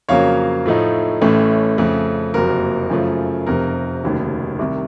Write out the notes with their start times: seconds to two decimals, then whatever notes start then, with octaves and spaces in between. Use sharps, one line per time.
0.09 F2 C#3 F#3 A#3 C#5 F5
0.66 A2 F3 A3 D#4
1.21 A1 A2 A3 C#4
1.78 F2 C#3 A3
2.34 F#1 F2 C3 F#3 A#3 A#4
2.90 F#2 C#3 F3 A3
3.47 F1 F2 C3 A#4
4.03 F1 D#2 C#3 F#3
4.59 C2 C3 D#3